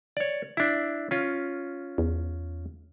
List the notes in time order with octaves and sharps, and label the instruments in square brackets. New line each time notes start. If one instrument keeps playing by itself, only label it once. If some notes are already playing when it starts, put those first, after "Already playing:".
[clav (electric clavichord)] C#5 D5
D4 E4
C#4 F4
[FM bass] E2